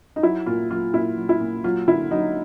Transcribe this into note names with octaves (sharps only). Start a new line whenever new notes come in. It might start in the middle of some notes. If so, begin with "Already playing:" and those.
D#4
F#3 E4
A#2 F4
F#3 F4
A#2 E4
F#3
E4
A#2
F#3 F4
D3 E4
F#3 D#4